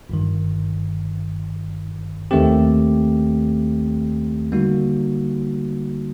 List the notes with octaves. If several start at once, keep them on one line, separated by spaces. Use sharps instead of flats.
G1 G2 D#3
D#2 D#3 A3 C4 G4
D3 G3 A#3 D#4 F#4